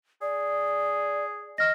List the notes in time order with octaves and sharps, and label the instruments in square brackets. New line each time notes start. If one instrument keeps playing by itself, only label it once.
[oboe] G#4 [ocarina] D5
[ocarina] D#5 [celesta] F6 A#6